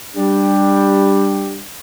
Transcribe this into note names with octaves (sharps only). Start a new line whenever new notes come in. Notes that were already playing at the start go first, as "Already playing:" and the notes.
G3 D4 G4